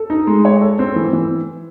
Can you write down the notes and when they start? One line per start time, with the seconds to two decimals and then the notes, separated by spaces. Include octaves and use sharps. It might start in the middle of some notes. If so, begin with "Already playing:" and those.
Already playing: A4
0.10 D#4
0.27 G#3
0.45 C#5
0.61 A4
0.79 C4
0.96 E3
1.13 E3